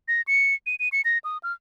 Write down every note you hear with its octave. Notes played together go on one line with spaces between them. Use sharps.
A#6
C#7
D#7
D#7
C#7
A#6
D#6
F6